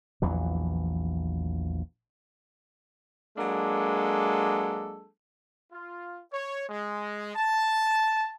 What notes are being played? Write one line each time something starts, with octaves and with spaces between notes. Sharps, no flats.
A#1 E2 E3 F#3
F#3 G#3 A#3 D4 A4
F4
C#5
G#3
A5